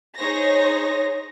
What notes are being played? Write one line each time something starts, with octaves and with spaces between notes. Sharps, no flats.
D#4 G#4 C5 C#5 A#6